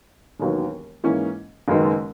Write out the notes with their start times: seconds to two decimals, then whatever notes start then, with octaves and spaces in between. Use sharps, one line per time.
0.40 E1 D#2 D#3 F#3 B3
1.04 G#2 E3 A#3 C#4
1.68 F#1 F#2 D#3 G#3 B3